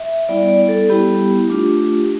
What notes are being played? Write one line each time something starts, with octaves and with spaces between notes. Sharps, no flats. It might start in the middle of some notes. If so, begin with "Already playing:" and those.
Already playing: E5
G3 B3 E4 D5
D5
A4
G3 B3 E4 G4
A3 D4 F4